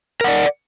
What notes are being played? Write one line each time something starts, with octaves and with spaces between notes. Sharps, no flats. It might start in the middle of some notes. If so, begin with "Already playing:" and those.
A#4 D5 F#5